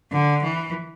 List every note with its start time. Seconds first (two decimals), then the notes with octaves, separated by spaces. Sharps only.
0.12 D3
0.43 E3